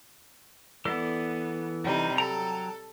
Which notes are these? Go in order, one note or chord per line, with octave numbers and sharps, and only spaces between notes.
E3 B3 A4 D5
C3 G3 D#4
F#3 A4 G5 A#5